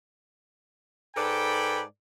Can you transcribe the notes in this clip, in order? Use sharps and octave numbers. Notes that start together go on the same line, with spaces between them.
G#2 A4 B4 D5 G5 B5